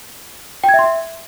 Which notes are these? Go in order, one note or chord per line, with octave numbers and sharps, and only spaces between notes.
G5
G#6
E5
C6
E5